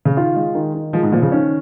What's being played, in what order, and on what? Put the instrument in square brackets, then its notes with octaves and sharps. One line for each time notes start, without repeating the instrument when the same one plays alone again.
[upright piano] C#3
[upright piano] D#3 [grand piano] F4
[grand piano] G#3
D#3
D#3
[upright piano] F3 [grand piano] G#3
[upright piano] G#2
[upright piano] A#2 [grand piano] F3
[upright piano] C#3
[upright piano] D#3 [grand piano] C#4